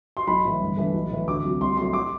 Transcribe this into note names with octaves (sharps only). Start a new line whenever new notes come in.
C6
B1 B5
A2 E3
G1
G2 E3 A3
B1
A2 E3
D2 D6
C3 F#3
C2 C6
C3 F#3 A3 C6
D6